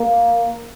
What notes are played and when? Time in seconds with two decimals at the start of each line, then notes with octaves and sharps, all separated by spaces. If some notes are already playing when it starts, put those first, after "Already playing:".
Already playing: A#3